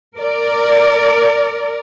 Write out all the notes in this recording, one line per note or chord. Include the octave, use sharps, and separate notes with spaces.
A#4 D5